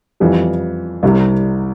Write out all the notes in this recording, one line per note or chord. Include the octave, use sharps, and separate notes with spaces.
F2 E3 G3
C2 C3 G3